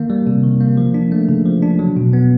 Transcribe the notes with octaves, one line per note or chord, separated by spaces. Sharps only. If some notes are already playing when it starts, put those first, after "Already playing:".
Already playing: D#3 A#3
G3
C3
D#3
A#3
F3
D4
A3
C#3
F3
D4
F#3
B2
B3